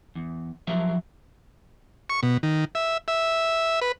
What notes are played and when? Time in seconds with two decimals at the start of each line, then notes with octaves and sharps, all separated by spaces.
0.15 E2
0.67 F3 F#3 G4 A#4 C5 E5
2.10 C#6
2.23 B2
2.43 D#3
2.75 E5
3.08 E5
3.81 B4